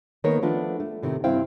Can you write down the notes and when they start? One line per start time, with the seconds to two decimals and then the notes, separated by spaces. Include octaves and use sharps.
0.24 D#3 A#3 B3 A#4 C#5
0.42 F3 A3 B3 D4 F4
0.80 A3
1.03 A2 C3 D#3
1.24 G2 C3 C4 E4 F5 G5